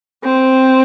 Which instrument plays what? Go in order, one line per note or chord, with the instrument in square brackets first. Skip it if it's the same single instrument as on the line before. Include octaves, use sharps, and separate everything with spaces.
[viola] C4